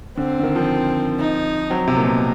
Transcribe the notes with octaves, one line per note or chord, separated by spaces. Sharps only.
D3 C4
D3
D#3
F3
D#4
F#3 C4
C3
A#2
B2